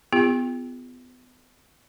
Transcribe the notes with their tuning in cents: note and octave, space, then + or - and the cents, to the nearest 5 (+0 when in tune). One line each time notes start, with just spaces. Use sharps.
B3 +30 F4 -20 G#4 -45